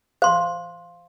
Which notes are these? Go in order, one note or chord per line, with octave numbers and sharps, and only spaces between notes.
C5 F5 C6